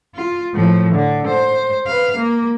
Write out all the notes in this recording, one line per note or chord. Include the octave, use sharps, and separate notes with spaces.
F4
A2 F3
D3
C5
B4 F5
A#3